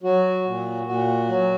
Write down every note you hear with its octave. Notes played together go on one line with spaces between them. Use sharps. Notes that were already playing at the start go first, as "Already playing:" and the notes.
F#3 F#4
A#2
A#2 F#4
F#3